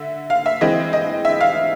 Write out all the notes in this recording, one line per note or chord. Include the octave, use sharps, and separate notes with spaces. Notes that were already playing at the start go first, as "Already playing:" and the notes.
Already playing: D3 E5
F5
E5
E3 G#3 C4 D#5
D#5
E5
F5